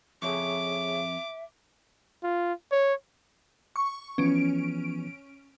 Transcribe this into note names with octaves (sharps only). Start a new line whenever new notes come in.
F2 G#4 C#5 E5 C#6 D6
F4
C#5
C#6
E3 F3 B3 C#4 D7